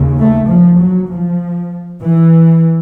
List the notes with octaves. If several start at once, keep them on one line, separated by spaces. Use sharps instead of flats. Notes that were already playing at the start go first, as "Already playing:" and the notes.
Already playing: D#2 C#3
A3
F3
F#3
F3
E3